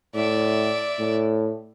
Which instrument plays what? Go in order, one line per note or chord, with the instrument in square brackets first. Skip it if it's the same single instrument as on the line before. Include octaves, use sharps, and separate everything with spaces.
[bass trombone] A2 [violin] D5 E5
[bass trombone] A2